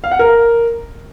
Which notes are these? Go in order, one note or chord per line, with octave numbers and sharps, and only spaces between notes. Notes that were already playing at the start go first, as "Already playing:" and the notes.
F5
F#5
A#4